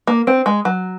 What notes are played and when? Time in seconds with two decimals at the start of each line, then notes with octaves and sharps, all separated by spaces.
0.07 A#3
0.27 C4
0.46 G#3
0.65 F#3